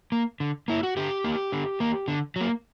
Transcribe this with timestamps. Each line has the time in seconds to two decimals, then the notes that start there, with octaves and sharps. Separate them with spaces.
0.12 A#3
0.40 D3
0.68 A#3 E4
0.83 F#4
0.97 D3 G4
1.24 A#3
1.52 D3
1.80 A#3
2.08 D3
2.36 F#3 A#3